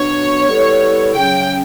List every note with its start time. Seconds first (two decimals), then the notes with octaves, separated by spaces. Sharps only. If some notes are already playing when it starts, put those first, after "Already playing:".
Already playing: B2 F#3 B3 D4 C#5
0.47 G3 B3 E4 A4
1.14 C#3 F#3 C#4 G5